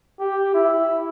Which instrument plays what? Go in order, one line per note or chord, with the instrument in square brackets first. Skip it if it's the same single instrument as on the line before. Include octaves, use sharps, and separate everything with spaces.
[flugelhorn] G4
E4